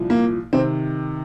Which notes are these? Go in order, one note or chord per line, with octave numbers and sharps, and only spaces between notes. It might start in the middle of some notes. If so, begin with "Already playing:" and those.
Already playing: C2 A#2 F3
A#3
C3 D#3 C4